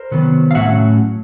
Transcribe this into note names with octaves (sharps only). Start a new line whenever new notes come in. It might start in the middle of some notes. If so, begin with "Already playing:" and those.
Already playing: A#4 C5
C3 D#3 F#3 B3
F5
A2 F#3 A3 C#4 E5 F#5